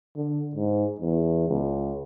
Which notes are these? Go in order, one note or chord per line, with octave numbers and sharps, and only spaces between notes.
D3
G#2
E2
C#2